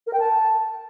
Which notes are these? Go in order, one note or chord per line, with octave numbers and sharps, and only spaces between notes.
A#4
G5
A5